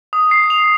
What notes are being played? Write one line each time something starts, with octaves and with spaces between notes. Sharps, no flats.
D#6
C7
F7